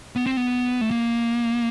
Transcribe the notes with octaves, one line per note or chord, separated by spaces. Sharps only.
B3
C4
B3
A3
A#3